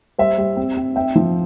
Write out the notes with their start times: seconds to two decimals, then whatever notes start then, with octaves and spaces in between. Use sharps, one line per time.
0.18 G3 C5 E5
0.38 G3
0.57 C4
0.77 C4
0.96 C4 E5 G5
1.15 F3